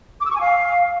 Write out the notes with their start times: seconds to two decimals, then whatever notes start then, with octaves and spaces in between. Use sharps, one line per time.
0.21 D6
0.26 E6
0.31 C#6
0.36 G#5
0.41 F5